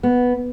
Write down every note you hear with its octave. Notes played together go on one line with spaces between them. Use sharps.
B3